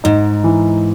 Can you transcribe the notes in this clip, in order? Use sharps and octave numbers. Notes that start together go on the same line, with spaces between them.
G#2 D#4
E3